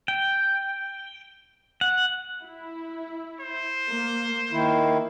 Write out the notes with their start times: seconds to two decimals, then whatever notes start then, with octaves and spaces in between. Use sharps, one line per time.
0.08 G5
1.81 F#5
2.43 E4
3.40 C5
3.89 A#3
4.52 D#3 A#3 E4